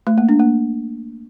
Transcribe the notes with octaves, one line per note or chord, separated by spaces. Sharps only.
A3
A#3
D4
A#3